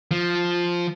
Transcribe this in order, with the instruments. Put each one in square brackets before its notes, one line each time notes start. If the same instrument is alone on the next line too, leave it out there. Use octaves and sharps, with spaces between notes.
[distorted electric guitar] F3